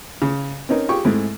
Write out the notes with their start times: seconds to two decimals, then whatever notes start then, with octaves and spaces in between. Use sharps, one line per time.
0.22 C#3
0.69 C4 C#4 D#4 A#4
0.89 F4 G4 G#4 G5 C#6
1.05 G#2 G#3 A3 C4 E4